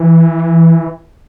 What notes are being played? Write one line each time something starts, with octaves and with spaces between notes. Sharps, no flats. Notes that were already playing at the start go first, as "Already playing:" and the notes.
Already playing: E3